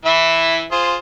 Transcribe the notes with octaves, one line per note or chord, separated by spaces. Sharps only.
E3 E4 E5
F4 G#4 C5